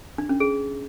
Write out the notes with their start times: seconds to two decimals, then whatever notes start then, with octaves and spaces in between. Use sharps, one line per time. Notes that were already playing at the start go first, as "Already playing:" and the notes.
0.18 D4
0.29 C#4
0.40 G#4